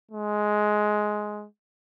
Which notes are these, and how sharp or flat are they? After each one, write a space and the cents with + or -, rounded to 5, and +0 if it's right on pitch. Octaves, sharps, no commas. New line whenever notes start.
G#3 +10